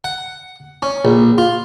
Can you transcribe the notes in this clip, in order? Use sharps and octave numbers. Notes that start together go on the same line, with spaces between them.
F#5
C#4
A#1
F4